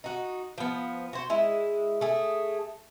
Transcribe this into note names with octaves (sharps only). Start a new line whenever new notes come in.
D#4 F#4
F3 B3
F#4 C5
G#3 E4
A3 G#4